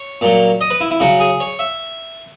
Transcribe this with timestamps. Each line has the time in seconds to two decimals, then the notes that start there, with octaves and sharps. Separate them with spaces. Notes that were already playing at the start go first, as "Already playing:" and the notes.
Already playing: C#5
0.21 A#2 F#3
0.61 D#5
0.71 B4
0.81 E4
0.91 E4
1.00 C#3 F#3 F#4
1.20 G#4
1.40 C#5
1.59 E5